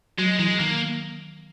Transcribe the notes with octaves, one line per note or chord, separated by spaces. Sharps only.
F#3 G#3
E3 G#3
D#3 A#3